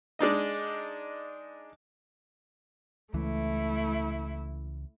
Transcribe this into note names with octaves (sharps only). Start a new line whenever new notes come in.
G#3 D4 D#4 D#5
C#2 E3 A3 E4